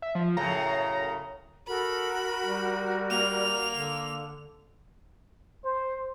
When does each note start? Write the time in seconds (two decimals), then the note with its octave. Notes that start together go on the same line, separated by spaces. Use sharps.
0.02 E5
0.15 F3
0.37 F#2 A2 C#3 A#5
1.67 F#4 A4 A#4 B5
2.45 G3
3.10 A#3 F7
3.72 D3
5.65 C5